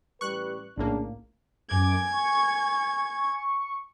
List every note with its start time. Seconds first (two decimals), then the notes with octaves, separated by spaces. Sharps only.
0.21 A1 G3 B4 C#6 F#6
0.78 A#1 A2 C#3 A#3 D4
1.69 F#2 G#5 D6 G#6
2.12 C#6